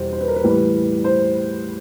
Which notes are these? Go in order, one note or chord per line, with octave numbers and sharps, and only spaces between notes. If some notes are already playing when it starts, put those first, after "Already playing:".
Already playing: E2 B2 G3 C5
C5
B4
A#4
B4
A2 E3 G3
C5